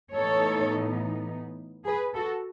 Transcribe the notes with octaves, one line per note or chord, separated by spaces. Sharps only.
A2 E3 B3 D#4 A4 C#5
G#4 B4
F#4 A4